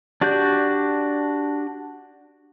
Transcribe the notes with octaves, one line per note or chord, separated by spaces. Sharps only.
D4 F#4 G4 D5 G6